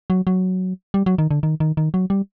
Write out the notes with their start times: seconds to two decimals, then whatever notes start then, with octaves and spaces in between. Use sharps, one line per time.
0.10 F#3
0.27 F#3
0.94 G3
1.06 F#3
1.18 D#3
1.31 D3
1.43 D#3
1.60 D#3
1.77 D#3
1.94 F#3
2.10 G3